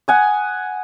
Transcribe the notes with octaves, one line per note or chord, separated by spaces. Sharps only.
F#5 G#5 D#6